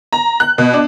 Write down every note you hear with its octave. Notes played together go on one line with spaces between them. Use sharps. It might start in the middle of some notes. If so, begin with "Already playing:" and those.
A#5
F#6
B2
D4